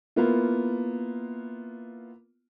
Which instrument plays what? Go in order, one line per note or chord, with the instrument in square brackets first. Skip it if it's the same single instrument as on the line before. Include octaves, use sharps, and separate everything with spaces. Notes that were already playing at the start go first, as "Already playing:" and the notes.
[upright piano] A#3 B3 E4 F4